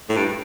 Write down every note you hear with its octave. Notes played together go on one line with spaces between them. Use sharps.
A2
G2